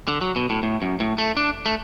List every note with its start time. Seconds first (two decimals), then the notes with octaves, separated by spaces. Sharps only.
0.08 D3
0.21 F#3
0.36 B2
0.50 A2
0.63 A2
0.82 F#2
1.00 A2
1.18 A3
1.37 D4
1.66 A3